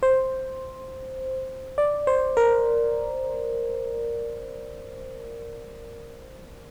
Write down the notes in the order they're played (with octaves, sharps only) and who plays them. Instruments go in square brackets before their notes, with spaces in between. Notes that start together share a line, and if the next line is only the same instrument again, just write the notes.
[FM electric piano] C5
D5
C5
A#4